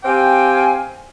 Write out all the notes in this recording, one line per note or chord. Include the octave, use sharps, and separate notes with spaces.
C4 G4 F5 G5 G#5